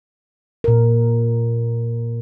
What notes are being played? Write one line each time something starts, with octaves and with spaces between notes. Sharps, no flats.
A#2 A#4